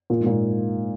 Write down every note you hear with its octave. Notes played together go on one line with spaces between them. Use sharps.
A#2
G#2
A#2